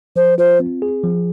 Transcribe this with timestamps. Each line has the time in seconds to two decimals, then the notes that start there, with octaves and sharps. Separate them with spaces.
0.16 F3 C5
0.38 F4 C5
0.60 C4
0.82 G#4
1.04 F3